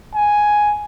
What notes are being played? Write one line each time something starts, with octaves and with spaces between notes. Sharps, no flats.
G#5